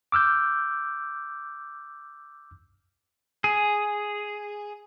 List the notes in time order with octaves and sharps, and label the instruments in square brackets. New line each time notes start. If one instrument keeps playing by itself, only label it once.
[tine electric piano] D6 E6 F6 G6
[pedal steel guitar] G#4